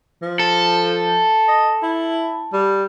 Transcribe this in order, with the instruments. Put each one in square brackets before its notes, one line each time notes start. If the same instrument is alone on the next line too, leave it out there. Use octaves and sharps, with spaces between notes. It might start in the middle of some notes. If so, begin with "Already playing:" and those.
[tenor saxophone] F3
[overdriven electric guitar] A4
[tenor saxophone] D#5
E4
G3